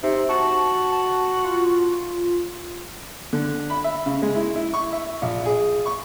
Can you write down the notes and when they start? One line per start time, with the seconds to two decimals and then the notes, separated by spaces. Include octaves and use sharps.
0.03 C3 D#4
0.29 F#4 A5
0.92 A5
1.44 F4
3.33 D3
3.70 B5
3.84 E5
4.06 C#3
4.22 G#3
4.36 E4
4.56 E4
4.74 C#6
4.92 E5
5.22 A#1
5.46 G#4
5.86 C#6